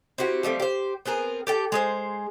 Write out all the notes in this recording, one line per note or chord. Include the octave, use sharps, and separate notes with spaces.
C4 E4 F#4 G4
F3 G3 A3 C4
G4 C5
B3 C4 G#4 A#4
G4 A4 G5
G#3 G#4 C5